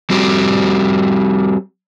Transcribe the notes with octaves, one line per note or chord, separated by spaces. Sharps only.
G3 C4 F#4 G4